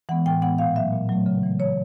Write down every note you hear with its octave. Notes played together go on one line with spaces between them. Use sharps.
E3 G#3 B3 F#5
A2 G5
E3 G#3 B3 F#5
A#2 F5
F#3 A3 E5
A#2
F#3 A3
C#3
E3 A3
C#3 C#5